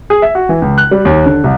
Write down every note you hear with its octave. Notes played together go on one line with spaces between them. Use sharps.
G#4
E5
F#4
E3
C#2
F#6
G3
D#2
D3
C2